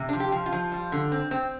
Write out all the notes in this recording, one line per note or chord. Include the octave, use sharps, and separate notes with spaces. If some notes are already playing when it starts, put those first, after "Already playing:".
Already playing: C3
D4
F3
G4
F3
F4
F3
G3
D3
C4
C4